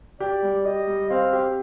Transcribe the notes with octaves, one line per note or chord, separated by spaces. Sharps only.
G4 D5
G3
G4 D#5
G3
C4 F5
G4